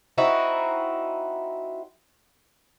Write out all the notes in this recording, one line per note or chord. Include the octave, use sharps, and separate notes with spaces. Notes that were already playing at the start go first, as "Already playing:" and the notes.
C4 D#4 E4 F#4